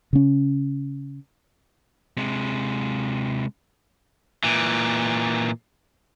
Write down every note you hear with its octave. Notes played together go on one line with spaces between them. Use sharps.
C#3 C#4
C3 G#3
A#2 E3